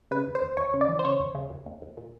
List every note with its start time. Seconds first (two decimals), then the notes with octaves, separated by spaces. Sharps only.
0.11 C#3 B4
0.27 D#2
0.35 C5
0.42 D#2
0.57 D#2 C#5
0.74 C#3
0.81 D5
0.88 E3
0.99 C5
1.04 C#3 C#5
1.20 D#2
1.35 C#3
1.50 D#2
1.66 D#2
1.82 D#2
1.97 A#2